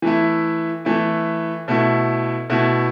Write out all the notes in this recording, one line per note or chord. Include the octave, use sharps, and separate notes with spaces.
E3 A3 E4
E3 A3 E4
B2 A3 E4
B2 A3 E4